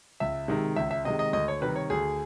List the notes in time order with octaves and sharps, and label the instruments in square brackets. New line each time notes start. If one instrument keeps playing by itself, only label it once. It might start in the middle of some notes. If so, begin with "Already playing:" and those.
[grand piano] C#2 E5
C3 D#3 G#3
C#2 E5
E5
C3 D#3 G#3 D#5
D#5
D2 D#5
C#5
C3 D#3 G3 B4
C#5
D2 G#4